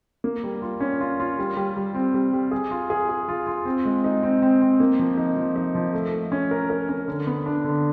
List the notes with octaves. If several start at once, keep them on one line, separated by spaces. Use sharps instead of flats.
A#3
G3
F4
C#4
F4
F4
G3
G3
G3
C4
G3
G3
G#4
F4
G#4
G#4
F4
F4
C4
G#3
D#4
C4
C4
C4
A#3
F3
D#4
F3
D#4
F3
A3
A3
C#4
A#4
A#4
C#4
D3
B3
D4
D3